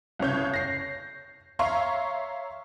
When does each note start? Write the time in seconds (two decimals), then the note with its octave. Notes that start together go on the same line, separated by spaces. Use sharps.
0.19 C2 C#3 C#5 G6
0.54 A#6 C7
1.59 C#5 E5 F5 A#5 C6 C#6